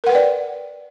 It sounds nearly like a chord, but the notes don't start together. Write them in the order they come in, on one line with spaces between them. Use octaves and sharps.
A#4 F#5 B4 G5 D5